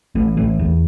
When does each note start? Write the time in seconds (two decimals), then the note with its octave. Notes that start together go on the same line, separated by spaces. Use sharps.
0.15 A1 A2
0.37 A1 A2
0.59 E2